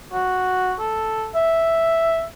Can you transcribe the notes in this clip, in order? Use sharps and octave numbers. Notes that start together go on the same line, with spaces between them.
F#4
A4
E5